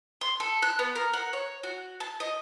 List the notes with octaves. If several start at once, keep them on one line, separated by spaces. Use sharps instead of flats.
C6
A4
F#6
B3
A#4
F#5
C#5
F#4
A5
D#5